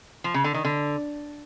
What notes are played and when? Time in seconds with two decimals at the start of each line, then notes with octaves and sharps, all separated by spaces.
0.24 F3
0.34 C#3
0.44 D3
0.54 D#3
0.65 D3